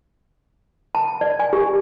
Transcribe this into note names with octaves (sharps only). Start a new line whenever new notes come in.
A5
D5
G#5
G4